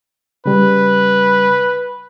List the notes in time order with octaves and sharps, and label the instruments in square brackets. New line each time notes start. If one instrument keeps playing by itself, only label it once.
[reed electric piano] C#3 G3 [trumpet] B4